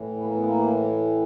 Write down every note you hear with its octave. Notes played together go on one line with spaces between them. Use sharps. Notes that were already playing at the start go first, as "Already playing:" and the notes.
Already playing: A2 E3
B3
A#3
B3
A#3